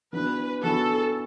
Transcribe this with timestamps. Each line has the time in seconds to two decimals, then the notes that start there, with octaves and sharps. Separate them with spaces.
0.13 E3 B3 D4 F#4 B4
0.63 E3 B3 D4 F#4 A4